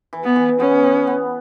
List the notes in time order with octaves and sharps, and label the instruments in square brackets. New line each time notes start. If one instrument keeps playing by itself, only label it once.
[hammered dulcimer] E3
[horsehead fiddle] B3
[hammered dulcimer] E3
[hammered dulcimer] B3 [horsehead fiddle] C#4
[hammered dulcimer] B3
B3